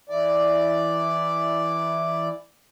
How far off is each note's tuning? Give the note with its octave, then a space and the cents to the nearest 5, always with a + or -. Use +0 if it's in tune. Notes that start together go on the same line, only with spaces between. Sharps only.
E3 +0 E4 +0 D5 +0